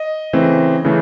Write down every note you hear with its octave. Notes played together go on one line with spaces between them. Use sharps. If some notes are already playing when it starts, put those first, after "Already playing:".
Already playing: D#5
C#3 E3 A3 C4
C#3 E3 A3